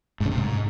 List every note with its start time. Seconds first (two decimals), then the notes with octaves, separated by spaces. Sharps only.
0.20 G#2
0.26 C#3
0.31 C3
0.36 G#2